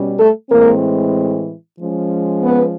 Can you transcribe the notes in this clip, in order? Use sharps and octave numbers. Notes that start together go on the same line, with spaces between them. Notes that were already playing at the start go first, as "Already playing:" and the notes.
Already playing: B2 G3 C#4
A3 A4
A2 E3 G#3 A#3 C4 A#4
F3 G#3 C#4
B3 B4